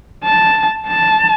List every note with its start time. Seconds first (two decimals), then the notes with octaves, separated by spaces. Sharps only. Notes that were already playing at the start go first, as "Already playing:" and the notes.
0.24 A5
0.87 A5